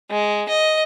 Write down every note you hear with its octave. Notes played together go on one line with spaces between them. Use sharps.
G#3
D#5